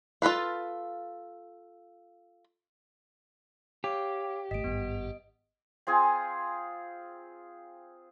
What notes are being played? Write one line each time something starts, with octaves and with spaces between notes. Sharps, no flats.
F4 A4 B4 F5
G4 C#5 F5 D6
G#1 A3 D#5 B6 D7
G#1 G2 B3
C4 F4 G#4 G#5